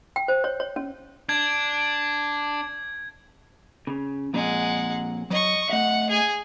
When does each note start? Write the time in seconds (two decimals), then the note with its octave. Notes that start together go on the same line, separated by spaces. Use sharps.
0.16 G5
0.28 C5
0.44 C#5
0.60 C#5
0.76 C#4
1.29 D4 G#6
3.87 C#3
4.33 F2 A#2 G#3 F#5
5.30 F#3 D#5 C#6
5.70 A3 D#5 E5 F#5
6.10 G#4 G#5